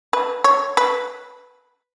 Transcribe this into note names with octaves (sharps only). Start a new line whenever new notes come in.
B4
C#5
B4